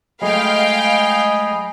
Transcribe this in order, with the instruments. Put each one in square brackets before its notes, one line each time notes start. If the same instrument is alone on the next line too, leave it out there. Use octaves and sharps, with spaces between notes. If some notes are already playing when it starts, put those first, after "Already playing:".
[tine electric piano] F#3 G#3 A3 [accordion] D#5 G#5 B5 [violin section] F5 G5